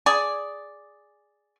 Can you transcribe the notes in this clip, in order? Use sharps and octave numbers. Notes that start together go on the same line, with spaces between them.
G#4 D5